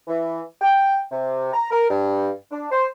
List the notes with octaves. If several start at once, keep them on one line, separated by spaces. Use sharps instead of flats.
E3
G5
C3
A#5
A#4
G2
D4
C5